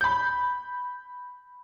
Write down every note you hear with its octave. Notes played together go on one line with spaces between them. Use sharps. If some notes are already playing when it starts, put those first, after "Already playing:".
B5 G6